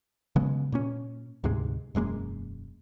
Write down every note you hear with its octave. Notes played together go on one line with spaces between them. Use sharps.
C#3 F#3 G#3 B3
A#2 A#3 C#4
D2 G#2 C3 G#3
E1 F#2 G#3 A#3